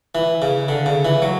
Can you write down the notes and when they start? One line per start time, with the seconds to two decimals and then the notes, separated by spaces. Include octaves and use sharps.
0.15 E3
0.42 C#3
0.68 D3
0.86 C#3
1.05 E3
1.22 F#3